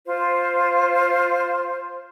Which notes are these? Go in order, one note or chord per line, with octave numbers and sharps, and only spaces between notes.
F4 C5